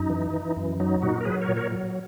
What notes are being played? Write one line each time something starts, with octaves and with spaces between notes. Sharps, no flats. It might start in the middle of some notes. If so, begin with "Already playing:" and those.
Already playing: F#2 D#4
E3
E3
F#2
F#3 D#4
A#2 D#4 F#4
A#4
F#3 G#4 B4
A#4 C#5
A#2
A#4 C#5
F#3